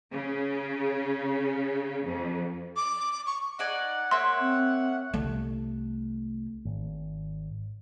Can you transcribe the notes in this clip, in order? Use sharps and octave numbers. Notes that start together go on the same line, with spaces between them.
C#3
F2
D6
C#6
D#4 D5 F#5 G#5
A#3 C#5 E5 C6
C4
C2 A3
G#1